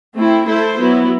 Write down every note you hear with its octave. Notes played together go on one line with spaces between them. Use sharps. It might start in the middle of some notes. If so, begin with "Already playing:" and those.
A3 C4 E4
A3 E4 A4 C5
F#3 B3 E4